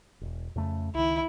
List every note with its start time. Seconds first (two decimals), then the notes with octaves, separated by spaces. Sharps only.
0.21 E1
0.56 F2 C#3 A3
0.95 C#2 D#3 E4